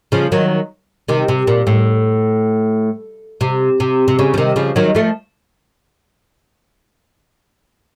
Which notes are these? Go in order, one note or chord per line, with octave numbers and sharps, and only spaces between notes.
C#3 F3
D#3 F#3
C3 D#3
C3
A#2
A2
C3
C3
C3
C#3
F3
C3 D#3
C#3 F3
D#3 F#3
F3 A3